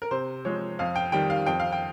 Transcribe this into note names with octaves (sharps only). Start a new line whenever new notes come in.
A#4
C3 C5
F3 G#3 C#5
F2 F5
G5
D#3 G3 G5
F5
F2 G5
F5
G5